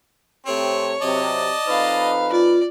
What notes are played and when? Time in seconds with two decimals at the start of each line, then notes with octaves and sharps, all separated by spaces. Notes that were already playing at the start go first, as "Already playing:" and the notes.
0.46 C3 A3 C4 G4 C#5
1.02 C3 F#3 D5 D#5 A5
1.67 F2 D#4 B4 F5
2.32 F4 D5